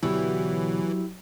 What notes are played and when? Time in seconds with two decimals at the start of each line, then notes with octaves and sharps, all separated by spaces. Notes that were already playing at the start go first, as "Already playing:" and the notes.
0.03 D2 B2 E3 F#3 E4 G4 C#5 D5